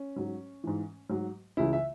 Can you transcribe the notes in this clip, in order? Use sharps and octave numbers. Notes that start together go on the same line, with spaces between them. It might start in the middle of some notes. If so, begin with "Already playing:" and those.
Already playing: C#4
G#2 F#3
G#2 E3
G#2 F#3
C#2 C#3 E3 E4
E5